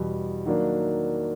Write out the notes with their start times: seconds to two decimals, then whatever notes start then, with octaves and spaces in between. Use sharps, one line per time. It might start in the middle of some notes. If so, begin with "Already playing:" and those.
Already playing: E2 B2 G3
0.45 D#3 F#3 A#3 D4